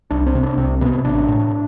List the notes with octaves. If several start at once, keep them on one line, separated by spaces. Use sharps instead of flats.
C2 D4
C4
C3
D4
C2 C4
C3 B3
A1 D4
A2